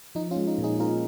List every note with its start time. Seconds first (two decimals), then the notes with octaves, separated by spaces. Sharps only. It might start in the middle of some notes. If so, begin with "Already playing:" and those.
0.15 F3 D#4
0.31 C#4 F4
0.36 G#3
0.47 D#4
0.58 A#2
0.64 D#4 G#4
0.79 D#4 F4 A#4